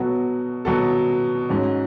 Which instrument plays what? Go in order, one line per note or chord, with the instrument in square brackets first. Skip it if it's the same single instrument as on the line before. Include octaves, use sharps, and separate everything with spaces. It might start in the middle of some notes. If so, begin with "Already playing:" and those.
Already playing: [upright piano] B2 F#3 B3 F#4 A4
B2 F#3 B3 F#4 A4
G#2 F#3 C#4